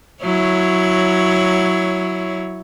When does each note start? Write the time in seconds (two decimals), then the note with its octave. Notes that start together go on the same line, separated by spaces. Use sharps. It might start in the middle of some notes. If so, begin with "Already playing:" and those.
0.23 F#3 E4 C#5